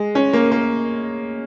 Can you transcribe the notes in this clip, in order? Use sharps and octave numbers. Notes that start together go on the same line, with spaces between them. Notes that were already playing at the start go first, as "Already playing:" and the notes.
Already playing: G#3
C#4
A#3
A#3